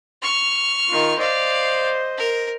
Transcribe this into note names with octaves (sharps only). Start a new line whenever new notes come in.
C#6 F6
D#3 F4
C5 D5 D#5 F5
A#4